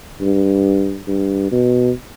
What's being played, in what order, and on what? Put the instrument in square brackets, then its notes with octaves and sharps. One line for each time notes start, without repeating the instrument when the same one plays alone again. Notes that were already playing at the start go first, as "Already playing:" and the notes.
[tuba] G2
G2
B2